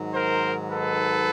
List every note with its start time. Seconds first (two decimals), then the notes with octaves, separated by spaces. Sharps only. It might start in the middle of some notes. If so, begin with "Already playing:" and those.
Already playing: G#2 D#3 F#3
0.13 A#4 C5
0.71 A4 B4